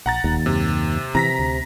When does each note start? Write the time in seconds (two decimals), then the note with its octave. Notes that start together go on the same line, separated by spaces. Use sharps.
0.06 A#1 F#5 A#5 A6
0.24 D#1 D#2
0.46 F#2 C3
1.15 C3 E3 A#5 A#6 B6
1.39 D2